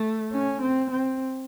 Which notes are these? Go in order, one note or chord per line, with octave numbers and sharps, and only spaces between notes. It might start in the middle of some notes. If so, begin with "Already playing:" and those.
Already playing: A3
C#4
C4
C4